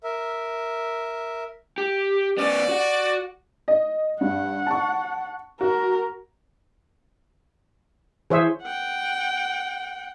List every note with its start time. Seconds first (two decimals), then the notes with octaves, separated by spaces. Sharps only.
0.04 A#4 E5
1.78 G4
2.38 B3 C#4 D5
2.69 F#4 F#5
3.68 D#5
4.21 G2 F#5
4.66 A5 C#6
5.61 F#4 A#4
8.30 E3 G#4 C5 C#5 E5
8.63 F#5 G5